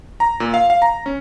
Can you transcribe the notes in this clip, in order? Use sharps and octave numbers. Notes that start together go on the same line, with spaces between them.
A#5
A#2
F5
F5
A#5
C#4